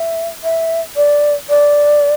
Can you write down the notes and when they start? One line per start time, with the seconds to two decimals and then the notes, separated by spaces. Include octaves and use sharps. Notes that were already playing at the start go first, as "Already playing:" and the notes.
Already playing: E5
0.44 E5
0.96 D5
1.49 D5